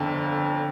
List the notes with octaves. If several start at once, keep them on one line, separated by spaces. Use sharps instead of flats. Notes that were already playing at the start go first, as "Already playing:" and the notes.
Already playing: G1 F2 D3